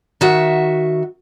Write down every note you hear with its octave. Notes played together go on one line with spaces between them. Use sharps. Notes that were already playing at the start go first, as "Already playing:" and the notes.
D#3 F#4 E5